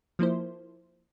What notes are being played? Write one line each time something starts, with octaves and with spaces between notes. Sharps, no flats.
F3 A#3 E4 C5